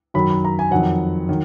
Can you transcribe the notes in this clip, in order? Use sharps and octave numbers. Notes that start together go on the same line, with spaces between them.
F#2 D#3 F#3 B5
B5
A#5
G#5
F2 D#3 F#3 F#5
D#3 F#3